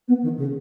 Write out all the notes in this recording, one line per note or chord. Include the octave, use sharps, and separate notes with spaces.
B3
D#3
C#3